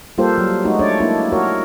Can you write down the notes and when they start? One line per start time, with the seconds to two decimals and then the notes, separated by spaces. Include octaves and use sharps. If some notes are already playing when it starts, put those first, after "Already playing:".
0.18 G3 A#3 F4 G4 A4 C5
0.38 F#3
0.65 G#3 A3 D#4 F#4
0.79 D4 C#5 D5
1.00 A#3 D4 E4
1.32 F#4 A#4 C#5